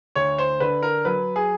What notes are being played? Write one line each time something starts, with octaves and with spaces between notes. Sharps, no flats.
D2 C#5
C5
D3 B4
A#4
F#3 B4
G#4